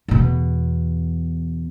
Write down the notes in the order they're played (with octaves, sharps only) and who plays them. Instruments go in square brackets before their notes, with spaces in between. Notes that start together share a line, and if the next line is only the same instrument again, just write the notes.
[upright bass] E2 B2